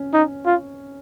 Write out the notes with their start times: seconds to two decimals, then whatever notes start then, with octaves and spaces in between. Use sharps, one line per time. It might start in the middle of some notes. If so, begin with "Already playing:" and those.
Already playing: C#4
0.13 D#4
0.46 F4